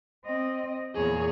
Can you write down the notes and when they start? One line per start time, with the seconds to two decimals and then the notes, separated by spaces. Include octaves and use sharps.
0.24 C4 D#5
0.94 E2 A#2 G#4 C#5